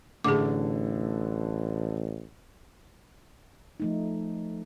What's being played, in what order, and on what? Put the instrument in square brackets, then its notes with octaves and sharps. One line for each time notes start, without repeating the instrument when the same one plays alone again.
[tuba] A1 [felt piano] A2 D3 [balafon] G#4 D6
[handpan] F3 A3 D#4